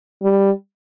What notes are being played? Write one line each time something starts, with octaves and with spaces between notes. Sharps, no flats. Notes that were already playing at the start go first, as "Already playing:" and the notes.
G3